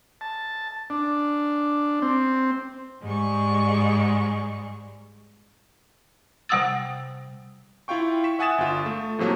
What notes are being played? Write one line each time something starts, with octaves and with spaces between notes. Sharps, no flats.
A5
D4
C4
G#2 G3 G#3 C#6
C3 G3 F#5 D#6 E6 A6
E4 F4 F5 G5 C#6
C#6 B6 E7
E5 F#5 G#5 D#6 A6 E7
G1 F4
A3
A2 C3 F3 F#3 A3 A#3